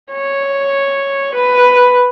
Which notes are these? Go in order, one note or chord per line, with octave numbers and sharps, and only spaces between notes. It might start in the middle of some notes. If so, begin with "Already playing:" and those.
C#5
B4